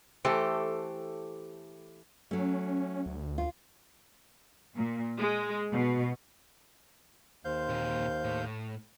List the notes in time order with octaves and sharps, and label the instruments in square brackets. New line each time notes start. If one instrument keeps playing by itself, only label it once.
[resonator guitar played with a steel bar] E3 A3 G4 A4 C5
[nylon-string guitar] F#3 A3 [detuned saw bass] C#4
[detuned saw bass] D2
[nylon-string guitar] F4
[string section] A#2
G#3
B2
[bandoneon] D#2 F5 G6 [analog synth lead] C5
[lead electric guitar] A#2 C4
A2